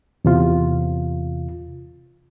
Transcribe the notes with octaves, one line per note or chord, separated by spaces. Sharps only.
E2 C3 F4